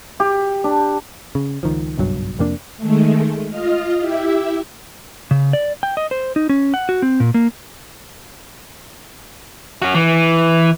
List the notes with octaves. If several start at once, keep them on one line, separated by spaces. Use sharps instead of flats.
G4
D4
C#3
C#2 D#3 F3
F#1 B1 G2 F#3
F2 C3 A#3 D4
D#3 G#3 A3
F4 D#5 F6
E4 G4 E5
C#3
D5
G5
D#5
C5
D#4
C#4
F#5
F#4
C4
A#2
A#3
C#4 F#4
E3